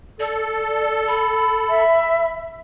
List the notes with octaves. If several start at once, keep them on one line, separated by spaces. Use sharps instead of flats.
A4 D5
B5
E5